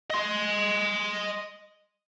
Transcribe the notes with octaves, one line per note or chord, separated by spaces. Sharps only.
D#5 C6